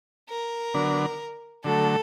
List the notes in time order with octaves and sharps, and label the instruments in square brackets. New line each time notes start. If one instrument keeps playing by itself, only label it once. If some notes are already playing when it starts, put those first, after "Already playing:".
[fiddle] A#4
[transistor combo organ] D3 F#3 B3 D4
[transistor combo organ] D3 F#3 A3 [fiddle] A4